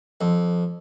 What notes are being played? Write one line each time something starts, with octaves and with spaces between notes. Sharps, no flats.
F2